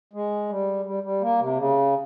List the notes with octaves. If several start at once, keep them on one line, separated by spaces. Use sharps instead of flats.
G#3
G3
G3
G3
A#3
C3
C#3